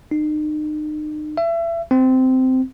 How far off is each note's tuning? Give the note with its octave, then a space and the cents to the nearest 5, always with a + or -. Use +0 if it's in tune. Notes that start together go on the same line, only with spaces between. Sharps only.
D#4 -40
E5 +30
C4 -15